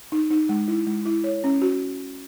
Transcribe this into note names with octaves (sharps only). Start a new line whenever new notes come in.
D#4
D#4
G#3
E4
G#3
E4
C#5
C#4
F#4